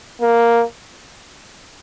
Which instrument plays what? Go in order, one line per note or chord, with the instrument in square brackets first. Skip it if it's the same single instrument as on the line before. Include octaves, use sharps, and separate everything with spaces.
[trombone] A#3